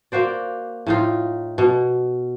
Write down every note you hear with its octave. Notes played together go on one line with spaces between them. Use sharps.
A#3 F#4 C5 D5
A2 D#4 F4
B2